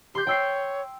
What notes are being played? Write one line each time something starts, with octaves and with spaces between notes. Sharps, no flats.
G4 C6 G6
C#5 G5 E6 C7